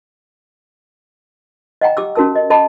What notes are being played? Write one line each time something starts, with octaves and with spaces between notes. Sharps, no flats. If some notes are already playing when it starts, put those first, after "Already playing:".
D#5 F#5 G5 A#5
G4 D6 E6
C#4 F#4 A4 A#4 A5 E6
D#5
A4 D#5 A5 B5